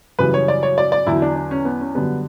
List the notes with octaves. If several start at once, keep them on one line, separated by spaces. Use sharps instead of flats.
F#2 C#3 E3 G3 B4
C#5
D5
C#5
D5
D5
E2 D3 F#3 E4
D4
D4
C#4
B3
C#4
F#2 D3 G3 B3